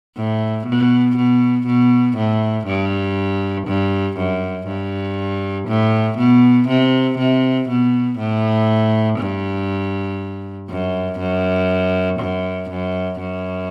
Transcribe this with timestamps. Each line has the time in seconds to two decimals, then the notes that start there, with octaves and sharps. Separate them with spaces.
0.16 A2
0.66 B2
1.16 B2
1.67 B2
2.17 A2
2.67 G2
3.67 G2
4.17 F#2
4.67 G2
5.68 A2
6.18 B2
6.68 C3
7.18 C3
7.69 B2
8.18 A2
9.19 G2
10.69 F#2
11.19 F#2
12.20 F#2
12.70 F#2
13.20 F#2